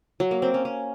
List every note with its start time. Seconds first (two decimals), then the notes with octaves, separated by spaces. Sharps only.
0.20 F#3
0.31 A#3
0.42 C4
0.54 C#4
0.65 C#4